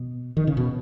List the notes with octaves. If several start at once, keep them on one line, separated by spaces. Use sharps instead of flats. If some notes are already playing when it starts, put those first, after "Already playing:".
Already playing: B2
D#3
C#3
B2